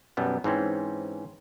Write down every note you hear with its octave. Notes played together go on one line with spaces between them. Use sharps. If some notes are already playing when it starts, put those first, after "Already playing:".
B1 F#2 G3 B3
G#2 E3 C4 C#4